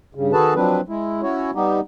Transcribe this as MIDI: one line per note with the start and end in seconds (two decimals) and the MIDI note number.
0.15 0.32 43
0.15 0.32 49
0.33 0.54 51
0.33 0.54 66
0.33 0.54 68
0.33 0.54 69
0.33 0.54 71
0.33 0.54 81
0.55 0.81 53
0.55 0.81 54
0.55 0.81 60
0.55 0.81 62
0.55 0.81 71
0.89 1.22 56
0.89 1.22 64
1.22 1.51 61
1.22 1.51 64
1.22 1.51 66
1.22 1.51 73
1.55 1.80 55
1.55 1.80 59
1.55 1.80 63
1.55 1.80 67